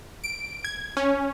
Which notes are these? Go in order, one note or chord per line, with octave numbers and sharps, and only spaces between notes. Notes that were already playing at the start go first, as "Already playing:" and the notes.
D7
G#6
C#4